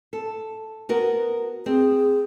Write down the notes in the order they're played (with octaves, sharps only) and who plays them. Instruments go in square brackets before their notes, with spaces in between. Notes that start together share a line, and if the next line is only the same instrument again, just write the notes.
[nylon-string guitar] A4
B3 F#4 A#4
[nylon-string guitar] C4 [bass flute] G#4